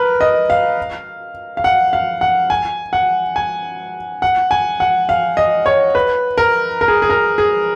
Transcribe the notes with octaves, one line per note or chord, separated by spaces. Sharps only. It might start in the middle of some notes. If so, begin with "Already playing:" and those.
Already playing: A#4 B4
D#5
F5
F5
F#5
F5
F#5
G#5
F#5
G#5
F#5
G#5
F#5
F5
D#5
C#5
B4
A#4
A#4
G#4
G#4
A#4
G#4